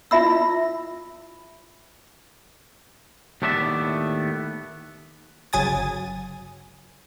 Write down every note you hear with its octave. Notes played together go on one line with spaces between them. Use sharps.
E4 F4 E5 B5 E6
D#2 A2 A3 B3 D5 E5
G1 C#3 F#3 G#5 D#6 A6